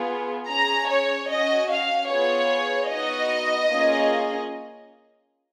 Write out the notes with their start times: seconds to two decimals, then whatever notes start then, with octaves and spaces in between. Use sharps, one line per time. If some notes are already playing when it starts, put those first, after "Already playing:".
Already playing: B3 F4 G#4
0.48 C#4 G#4 A#5
0.88 C#5
1.29 C#4 F#4 D#5
1.70 F5
2.09 B3 F4 G#4 C#5
2.90 B3 D#4 F#4 D#5
3.70 A#3 C#4 F4 G#4